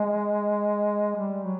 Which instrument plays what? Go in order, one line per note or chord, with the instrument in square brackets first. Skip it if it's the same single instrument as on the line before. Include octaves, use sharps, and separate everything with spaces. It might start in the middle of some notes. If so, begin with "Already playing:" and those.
Already playing: [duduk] G#3
G3
F#3